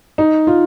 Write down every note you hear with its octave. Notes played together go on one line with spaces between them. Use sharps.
D#4
F4